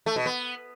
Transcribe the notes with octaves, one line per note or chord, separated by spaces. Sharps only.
A3
B2
B3